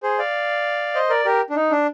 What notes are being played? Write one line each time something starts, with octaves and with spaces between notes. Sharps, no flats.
G#4 C5
D5 F5
C5 D#5
A#4 D5
G4 A#4
D4
D#4
D4